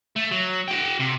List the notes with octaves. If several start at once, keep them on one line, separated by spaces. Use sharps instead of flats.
A3
F#3
F#4 G5
C3